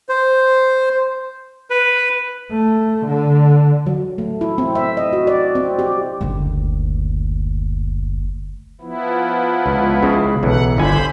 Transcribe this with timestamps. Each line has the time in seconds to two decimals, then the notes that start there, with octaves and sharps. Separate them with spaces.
0.09 C5
1.70 B4
2.51 A3
3.06 D3
3.86 F#3
4.18 A3
4.41 E4
4.58 C4
4.75 E5
4.97 D#5
5.13 F#4
5.27 D5
5.55 C4
5.79 G4
6.21 F#1 D2
8.81 F3 B3 E4
9.66 C#2
10.02 C#2 C#3
10.43 B1 E3 F#5
10.77 G1 D3 C5 G#5 B5